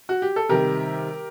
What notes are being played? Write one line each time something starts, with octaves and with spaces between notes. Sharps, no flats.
F#4
G4
A4
C3 D#3 G3 G4 A#4